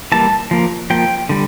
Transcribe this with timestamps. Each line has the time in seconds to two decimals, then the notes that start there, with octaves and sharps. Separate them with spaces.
0.12 E3 G3 A#3 A5
0.51 F3 A#3
0.90 F3 A#3 G5
1.29 D3 G3